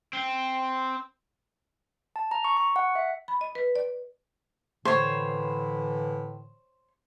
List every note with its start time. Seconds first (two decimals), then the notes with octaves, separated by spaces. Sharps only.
0.13 C4
2.16 A5
2.31 A#5
2.45 C#6
2.57 C#6
2.76 F#5
2.95 E5
3.28 B5
3.41 D#5
3.55 B4
3.75 D5
4.85 A2 D3 E3 C5 C#5